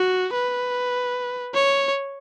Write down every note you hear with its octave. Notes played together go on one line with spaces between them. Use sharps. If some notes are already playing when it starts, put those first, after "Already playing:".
Already playing: F#4
B4
C#5